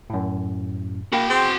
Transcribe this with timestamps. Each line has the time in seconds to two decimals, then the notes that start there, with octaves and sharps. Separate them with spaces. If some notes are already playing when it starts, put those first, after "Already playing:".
0.10 F#2 A2
1.12 A#3 F#4 G5 B5
1.30 C4 G#4 C6